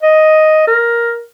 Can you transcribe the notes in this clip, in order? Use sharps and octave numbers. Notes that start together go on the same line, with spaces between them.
D#5
A#4